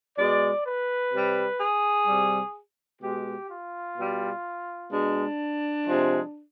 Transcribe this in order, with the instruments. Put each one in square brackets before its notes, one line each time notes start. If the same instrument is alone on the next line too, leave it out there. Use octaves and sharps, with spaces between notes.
[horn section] B2 G#3 D5
B4
C3 G3
G#4
C3 G3
B2 G#3 G4
F4
B2 G3
B2 G#3 D4
C3 F3 G#3